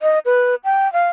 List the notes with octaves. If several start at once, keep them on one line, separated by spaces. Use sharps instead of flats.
D#5
B4
G5
F5